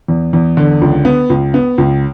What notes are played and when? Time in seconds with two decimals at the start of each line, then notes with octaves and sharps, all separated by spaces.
0.08 E2
0.33 E2
0.57 D3
0.81 C#2
1.05 B3
1.30 C#2
1.54 B3
1.78 C#2